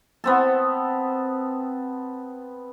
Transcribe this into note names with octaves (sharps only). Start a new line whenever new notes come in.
B3 C4 A4